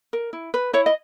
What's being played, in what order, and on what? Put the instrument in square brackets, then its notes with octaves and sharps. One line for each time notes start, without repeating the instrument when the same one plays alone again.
[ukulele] A#4
E4
B4
E4 C#5 E5
D#5